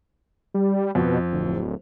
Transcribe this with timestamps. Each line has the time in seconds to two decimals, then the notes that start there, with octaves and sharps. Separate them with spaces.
0.54 G3
0.95 F2 B2
1.33 D1